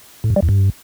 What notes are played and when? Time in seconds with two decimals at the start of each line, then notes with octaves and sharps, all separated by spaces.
0.24 A2
0.30 G2
0.36 G3
0.42 E2
0.49 G2